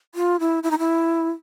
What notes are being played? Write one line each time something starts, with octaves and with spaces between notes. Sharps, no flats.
F4
E4
E4
D#4
E4